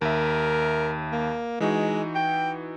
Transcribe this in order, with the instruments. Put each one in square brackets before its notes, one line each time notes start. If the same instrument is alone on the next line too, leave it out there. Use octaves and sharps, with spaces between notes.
[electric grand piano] D#2 E5 [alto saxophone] A#4
[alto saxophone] A#3
[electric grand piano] E3 D#4 F#4 [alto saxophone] G#3
[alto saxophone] G5